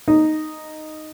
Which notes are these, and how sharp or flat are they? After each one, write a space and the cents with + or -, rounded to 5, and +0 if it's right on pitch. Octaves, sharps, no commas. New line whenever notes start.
D#4 -5